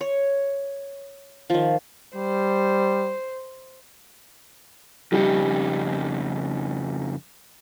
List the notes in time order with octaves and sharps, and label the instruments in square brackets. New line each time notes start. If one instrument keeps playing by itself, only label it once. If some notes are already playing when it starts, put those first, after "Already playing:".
[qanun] C#5
D#3 F3
[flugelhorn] G3 [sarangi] C5
[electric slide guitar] F2 C#3 D#4 [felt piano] G3